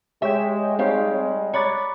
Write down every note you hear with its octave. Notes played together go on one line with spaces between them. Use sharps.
G#3 G4 C#5 E5 G5
G3 G#3 C4 D#4 G4 C#5 F5
C#5 D5 A#5 B5 D6 F#6 A6